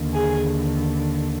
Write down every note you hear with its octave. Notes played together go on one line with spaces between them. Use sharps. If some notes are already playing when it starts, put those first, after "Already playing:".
Already playing: D#2 D3
G#4